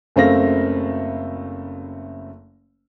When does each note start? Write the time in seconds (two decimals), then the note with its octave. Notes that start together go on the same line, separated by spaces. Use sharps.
0.16 F#1 C#3 A3 C4 F5 A#6